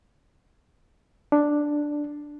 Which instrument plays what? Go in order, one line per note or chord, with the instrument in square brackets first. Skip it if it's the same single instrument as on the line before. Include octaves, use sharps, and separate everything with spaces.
[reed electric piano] D4